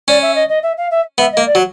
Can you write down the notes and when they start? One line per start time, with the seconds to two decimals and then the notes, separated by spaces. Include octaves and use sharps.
0.08 C#4 D5
0.22 E5
0.35 D#5
0.49 D#5
0.63 E5
0.77 F5
0.91 E5
1.18 B3 E5
1.32 D#5
1.37 A#3
1.46 D5
1.55 F#3